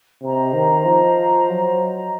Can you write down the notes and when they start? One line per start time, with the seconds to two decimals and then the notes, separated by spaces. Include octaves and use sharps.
0.21 C3 C5 D#5 A#5
0.53 D#3
0.85 F3
1.50 F#3